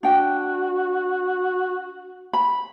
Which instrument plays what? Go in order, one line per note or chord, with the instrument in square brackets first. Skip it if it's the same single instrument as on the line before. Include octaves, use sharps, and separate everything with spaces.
[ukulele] D4 G5 [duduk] F#4
[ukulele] B5